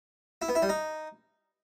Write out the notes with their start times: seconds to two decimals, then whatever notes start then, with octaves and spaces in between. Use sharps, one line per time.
0.42 E4
0.49 B3
0.55 E4
0.62 G3
0.69 D#4